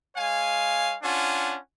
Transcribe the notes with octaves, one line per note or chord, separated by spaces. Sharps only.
G#3 C#5 F5 G#5
C#4 D4 F4 F#5 G#5